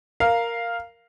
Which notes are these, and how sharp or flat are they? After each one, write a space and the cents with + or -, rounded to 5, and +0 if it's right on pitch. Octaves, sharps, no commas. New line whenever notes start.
A#4 +0 F5 +0